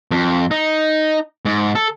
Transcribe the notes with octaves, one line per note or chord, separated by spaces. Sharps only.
F2
D#4
G#2
A4